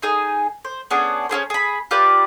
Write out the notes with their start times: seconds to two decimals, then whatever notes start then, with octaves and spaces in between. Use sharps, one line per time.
0.02 D#4 G#4 G#5
0.65 C5
0.91 B3 C#4 D4 G#4
1.29 C#4 E4 G#4 C5
1.50 G#4 B5
1.91 F4 G4 B4 D5